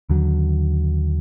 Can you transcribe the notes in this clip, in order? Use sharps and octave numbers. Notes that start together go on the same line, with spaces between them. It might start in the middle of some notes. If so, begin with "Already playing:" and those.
D#2 D3 F#3